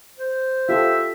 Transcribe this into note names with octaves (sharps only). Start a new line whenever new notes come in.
C5
F4 G4 A4 E5